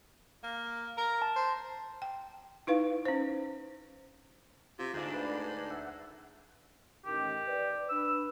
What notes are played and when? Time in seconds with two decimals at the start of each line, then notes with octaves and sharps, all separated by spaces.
0.43 A#3
0.98 A#4
1.22 A5
1.36 C5
2.02 G5
2.67 D#4 E4 B4 F5
3.05 C#4 C5
4.79 C3 F4
4.94 D2 G#2 D4
5.14 B4
5.70 E5 F#5
7.05 A1 D#3 G4
7.48 B4 D5
7.89 D4 B4 E6